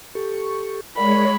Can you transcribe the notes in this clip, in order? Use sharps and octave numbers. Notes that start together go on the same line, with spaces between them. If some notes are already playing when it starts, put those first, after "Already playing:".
G4 A4 C#6
G#3 A#4 C#5 D5 B5